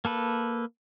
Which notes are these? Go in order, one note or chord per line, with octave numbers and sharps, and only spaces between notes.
A#3 A4 B4